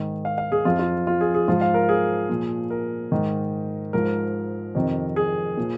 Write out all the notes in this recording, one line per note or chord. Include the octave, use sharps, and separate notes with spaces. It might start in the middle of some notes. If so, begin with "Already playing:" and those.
Already playing: G#2 D#3
F5
F5
G#4
F2 F3 F4
F4
F4
G#4
G#4
G#2 F3 F4
F5
A#4
G#4
A#2 F3
A#4
G#2 D#3
G#2 F3 A#4
F2 C3 D#3
G#4
A#2 F3